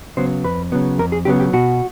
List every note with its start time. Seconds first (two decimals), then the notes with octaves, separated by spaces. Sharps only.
0.17 C#3 F#3 B3 C5
0.44 F2 B4
0.72 C#3 F#3 B3
0.98 F2 A#4
1.12 G#4
1.25 C#3 F#3 B3 G4
1.40 G4
1.53 B2 F#4